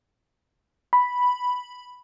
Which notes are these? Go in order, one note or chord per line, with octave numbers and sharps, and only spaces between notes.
B5